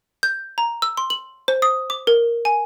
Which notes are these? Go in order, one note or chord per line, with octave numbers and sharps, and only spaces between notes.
G6
A#5
E6
C6
F#7
C5
D#6
D6
A#4
G#5